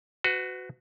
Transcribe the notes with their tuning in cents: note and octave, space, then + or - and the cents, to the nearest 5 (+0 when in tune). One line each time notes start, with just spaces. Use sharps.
F#4 +0 B4 +35